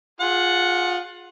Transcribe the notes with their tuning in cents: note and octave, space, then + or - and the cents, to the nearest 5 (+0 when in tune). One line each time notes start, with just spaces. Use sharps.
F4 +25 G#4 +0 F#5 +0